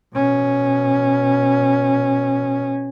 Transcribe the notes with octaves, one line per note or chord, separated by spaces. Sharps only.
B2 C#4